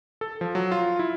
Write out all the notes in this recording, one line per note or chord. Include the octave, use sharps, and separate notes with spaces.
A4
F3
F#3
F4
E4